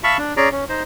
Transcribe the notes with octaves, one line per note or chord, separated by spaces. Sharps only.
E5 F5 A5 B5 C#6
D4
C#4 G#4 D5 A#5
C#4
D#4 C5